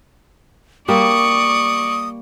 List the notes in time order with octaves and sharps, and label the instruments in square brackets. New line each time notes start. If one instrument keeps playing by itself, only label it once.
[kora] G3 A#3 [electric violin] D5 C#6 [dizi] D#6